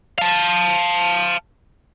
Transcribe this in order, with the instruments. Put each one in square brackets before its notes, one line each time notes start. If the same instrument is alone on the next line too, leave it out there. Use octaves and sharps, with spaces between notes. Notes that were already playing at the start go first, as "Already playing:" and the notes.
[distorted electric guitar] F5 A5